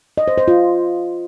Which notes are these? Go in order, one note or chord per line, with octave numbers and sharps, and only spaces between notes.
D#5
C5
C5
F4